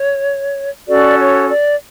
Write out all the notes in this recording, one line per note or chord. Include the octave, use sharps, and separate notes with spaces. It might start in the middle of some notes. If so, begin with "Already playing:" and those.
Already playing: C#5
C#4 F#4 A4 D5
C#5
D5